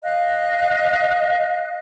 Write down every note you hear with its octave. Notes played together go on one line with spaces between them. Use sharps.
D#5 F5 F#6